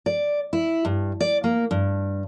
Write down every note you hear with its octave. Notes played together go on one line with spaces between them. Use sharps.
D5
E4
G2
D5
A#3
G2